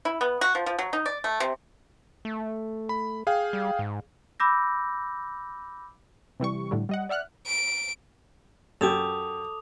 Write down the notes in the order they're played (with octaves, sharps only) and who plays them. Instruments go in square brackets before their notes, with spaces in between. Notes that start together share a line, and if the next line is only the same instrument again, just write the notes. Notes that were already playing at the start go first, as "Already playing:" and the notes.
[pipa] E4
B3
F#4
F3
F3
F#3
D#4
D5
A3
C3
[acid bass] A3
[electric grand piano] B5
G#4 F5 G5
[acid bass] G3
G#2
[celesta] B5 D6 E6 G6 A#6
[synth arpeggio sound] C3 E3 G3 C#6
A2 D3 G3
G3 D#5 F#5
D5 E5 F#5 F6 F#6
[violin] D7
[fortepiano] F#2 G4 [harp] A4 [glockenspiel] D6 D#6 F7